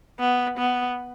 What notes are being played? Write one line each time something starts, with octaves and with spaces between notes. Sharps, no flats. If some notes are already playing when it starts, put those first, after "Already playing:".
B3
B3